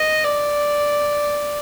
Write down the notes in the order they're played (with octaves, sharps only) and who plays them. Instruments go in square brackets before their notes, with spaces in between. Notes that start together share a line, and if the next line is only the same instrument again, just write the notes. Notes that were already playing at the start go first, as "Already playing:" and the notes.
Already playing: [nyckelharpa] D#5
D5